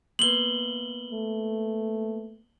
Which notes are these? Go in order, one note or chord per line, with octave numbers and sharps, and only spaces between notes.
A#3 B3 B4 F#7 G7
A3